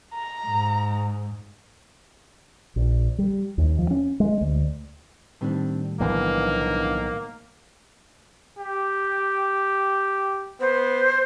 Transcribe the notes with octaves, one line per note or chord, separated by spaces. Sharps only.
A#5
G#2
A#1
G3
D#2
F3
C#4
G#3
D2
A2 D#3 G3 C4 D4
B1 D3 E3 F3 A#3 B3 D4
G4
B3 C5